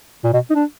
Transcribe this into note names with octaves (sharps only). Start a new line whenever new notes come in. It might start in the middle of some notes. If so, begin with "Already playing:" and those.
A#2
B2
D#4
D4